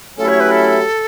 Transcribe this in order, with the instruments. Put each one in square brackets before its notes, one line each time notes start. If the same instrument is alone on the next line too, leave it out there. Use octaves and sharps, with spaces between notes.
[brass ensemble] F#3 A3 C#4 E4 G4 [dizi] A4
[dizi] C#5
B4
A4